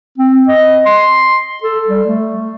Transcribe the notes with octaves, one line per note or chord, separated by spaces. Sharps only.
C4
D#5
C6
A4
G3
A3